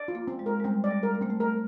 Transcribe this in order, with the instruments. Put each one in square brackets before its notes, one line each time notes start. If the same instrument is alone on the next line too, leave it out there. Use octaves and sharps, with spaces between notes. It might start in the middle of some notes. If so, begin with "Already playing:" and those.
Already playing: [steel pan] D5
F4
[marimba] A#3
[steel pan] C4
[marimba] G#3
[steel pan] A#4
[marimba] G#3
[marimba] G3 [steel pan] C4
[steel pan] D5
[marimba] G3
[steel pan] A#4
[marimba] A3
[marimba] A#3 [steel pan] C4
[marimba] A3
[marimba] A#3 [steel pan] A#4